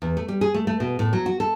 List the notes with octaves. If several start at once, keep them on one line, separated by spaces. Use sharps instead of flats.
E2
A3
G3
G#4
A3
A3
B2
A2
F#3
F#4
A4